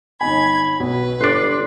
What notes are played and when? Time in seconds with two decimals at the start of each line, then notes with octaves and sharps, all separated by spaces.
0.21 G1 D#4 G#5 B5 G#6
0.80 B1 F#4 B4
1.21 G1 D4 C6 D6 F#6